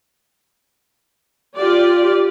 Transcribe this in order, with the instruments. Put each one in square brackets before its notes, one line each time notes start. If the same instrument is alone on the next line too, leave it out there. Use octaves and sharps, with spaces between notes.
[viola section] F4 G4 D5